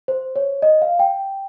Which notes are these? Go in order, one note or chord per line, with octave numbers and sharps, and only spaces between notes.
C5
C#5
D#5
F5
G5